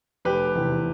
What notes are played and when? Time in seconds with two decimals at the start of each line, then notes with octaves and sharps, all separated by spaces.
0.25 F1 G4 B4
0.55 E2 C3 E3